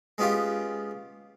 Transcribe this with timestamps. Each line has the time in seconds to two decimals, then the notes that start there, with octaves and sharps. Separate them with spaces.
0.18 G#3 B3 C#4 F4 G4